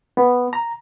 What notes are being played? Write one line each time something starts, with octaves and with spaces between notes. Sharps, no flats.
B3
A#5